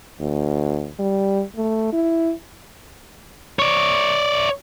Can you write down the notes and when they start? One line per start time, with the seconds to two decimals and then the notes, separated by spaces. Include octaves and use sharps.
0.20 D2
0.99 G3
1.56 A3
1.93 E4
3.59 C#5 D5